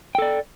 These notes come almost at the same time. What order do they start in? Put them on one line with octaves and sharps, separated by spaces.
G5 A4 D5